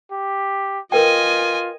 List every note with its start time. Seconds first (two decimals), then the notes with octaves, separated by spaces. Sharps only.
0.11 G4
0.92 F4 A#4 B4 D#5 G5 G#5